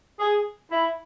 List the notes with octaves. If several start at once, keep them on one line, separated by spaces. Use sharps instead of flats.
G#4
E4